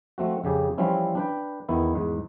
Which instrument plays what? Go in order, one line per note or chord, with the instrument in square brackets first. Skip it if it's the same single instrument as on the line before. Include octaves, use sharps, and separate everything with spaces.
[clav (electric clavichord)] F3 A3 C4 F#4
F2 C#3 G4 G#4
E3 F3 G3 C4 C#4 E4
D4 B4 G5
E2 D#3 B3 E4
E2 G#2